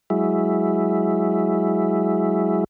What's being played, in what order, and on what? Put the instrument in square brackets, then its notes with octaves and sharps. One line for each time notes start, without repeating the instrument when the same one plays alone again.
[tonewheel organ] F#3 G#3 E4